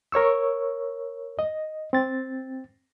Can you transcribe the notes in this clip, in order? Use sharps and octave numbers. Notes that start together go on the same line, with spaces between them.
A#4 C#5 C#6 E6
D#5
C4 A6